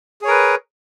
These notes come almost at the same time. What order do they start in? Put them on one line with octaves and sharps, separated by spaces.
G#4 C#5 A#4 B4